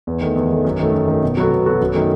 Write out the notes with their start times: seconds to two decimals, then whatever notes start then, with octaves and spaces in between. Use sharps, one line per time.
0.07 E2
0.21 D#3 A3
0.36 E2
0.50 D#3 A3
0.65 F#2
0.79 D#3 A3
0.93 F#2
1.08 D#3 A3
1.23 B2
1.37 F#3 B3 F#4 A4
1.51 B2
1.66 F#3 B3 F#4 A4
1.81 F#2
1.95 D#3 A3